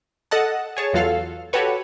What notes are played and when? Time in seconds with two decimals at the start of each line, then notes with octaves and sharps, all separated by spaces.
0.31 A4 D#5 F#5 A5
0.77 G#4 C#5 A5
0.93 E2 F#3 F4 A4 F5
1.53 F#4 G4 A4 B4 C#5